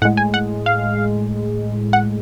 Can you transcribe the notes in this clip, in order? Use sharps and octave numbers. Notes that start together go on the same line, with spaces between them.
A2 G#3 F#5
G#5
F#5
F5
F#5